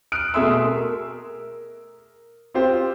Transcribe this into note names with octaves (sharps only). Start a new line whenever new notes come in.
F6 F#6 D7
B2 A3 G#4 E5 C6 E6
A#4
C4 F4 G4 C5